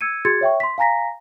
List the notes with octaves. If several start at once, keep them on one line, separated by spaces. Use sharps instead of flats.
E6 G#6 C#7 D#7
F#4 G#4 C6 G#6 A6 C#7
C#5 E5 G5 C#6
C6 B6
F5 G#5 A#5 A#6 B6